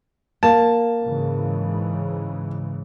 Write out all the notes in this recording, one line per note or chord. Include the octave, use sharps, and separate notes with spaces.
A#3 A5
G#2 C#3 E3